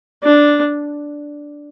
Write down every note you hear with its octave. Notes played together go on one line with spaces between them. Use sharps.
D4